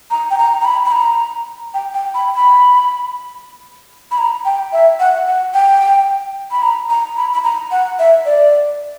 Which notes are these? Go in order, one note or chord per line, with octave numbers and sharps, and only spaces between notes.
A#5
G5
A#5
A#5
B5
B5
A#5
G5
G5
B5
B5
B5
A#5
G5
E5
F#5
F#5
G5
B5
A#5
A#5
B5
B5
A#5
F#5
E5
D5